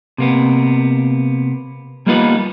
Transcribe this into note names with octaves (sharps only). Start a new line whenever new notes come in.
C3 A#3 B3
G3 A#3 B3 D#4 F4 B4